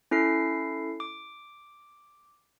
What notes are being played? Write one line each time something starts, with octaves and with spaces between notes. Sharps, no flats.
C#4 E4 A4 C7
D6